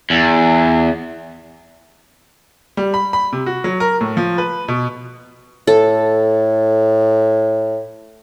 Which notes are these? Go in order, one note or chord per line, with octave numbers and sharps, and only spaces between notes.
E2
G3
B5
B5
C3
F#4
F#3
A#4
A2
F3
B4
B2
A2 A4